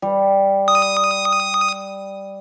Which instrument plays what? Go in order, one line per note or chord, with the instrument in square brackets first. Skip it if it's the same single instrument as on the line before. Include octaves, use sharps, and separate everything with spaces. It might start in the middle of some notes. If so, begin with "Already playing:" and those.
[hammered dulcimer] G3
[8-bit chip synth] D#6